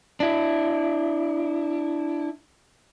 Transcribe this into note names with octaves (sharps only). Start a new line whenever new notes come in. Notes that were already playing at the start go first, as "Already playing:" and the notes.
D4 E4